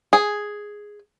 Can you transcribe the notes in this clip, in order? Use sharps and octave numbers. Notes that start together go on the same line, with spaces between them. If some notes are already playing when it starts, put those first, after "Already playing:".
G#4